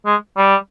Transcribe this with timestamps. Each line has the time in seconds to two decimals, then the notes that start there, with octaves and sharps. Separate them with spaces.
0.06 G#3
0.37 G3